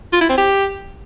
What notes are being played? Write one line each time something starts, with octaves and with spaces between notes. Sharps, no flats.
F4
E4
C4
G4